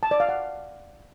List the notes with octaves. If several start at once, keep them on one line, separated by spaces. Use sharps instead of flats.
A5
D5
F5
F#5